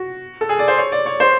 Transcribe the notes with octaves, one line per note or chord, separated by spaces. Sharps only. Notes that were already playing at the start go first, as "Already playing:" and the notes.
Already playing: F#4
A4
G#4
D5
C5
C#5
D5
C#5
C5